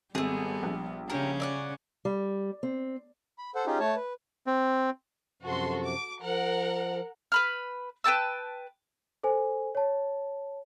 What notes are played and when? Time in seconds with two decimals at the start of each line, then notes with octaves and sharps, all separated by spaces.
0.15 G#1 G3 A3 B3 G#4
0.63 A#1
1.10 C#3 C#4 G4 A#4
1.40 D5 E5 F#5
2.05 G3
2.63 C4
3.38 B5
3.55 A4 C5 F#5
3.67 C#4 D#4 F4 G4 G#4
3.80 A3 C#5 A5
3.95 B4
4.47 C4
5.42 F#2 C3 F3 F#4 A4 C6
5.84 D6
6.22 F3 A#4 F#5
7.32 B4 B5 F6
8.04 B4 G5 A5 E6
9.23 A4 C5 G#5
9.75 C#5 A5